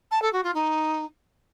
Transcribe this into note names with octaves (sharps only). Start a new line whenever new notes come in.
A5
A4
F#4
F4
D#4